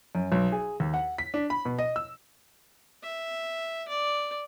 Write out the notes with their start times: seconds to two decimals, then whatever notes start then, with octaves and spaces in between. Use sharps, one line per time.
0.15 F#2
0.32 B1
0.52 G#4
0.80 D#2
0.94 F#5
1.18 B6
1.34 D4
1.50 B5
1.65 B2
1.79 D#5
1.96 E6
3.03 E5
3.88 D5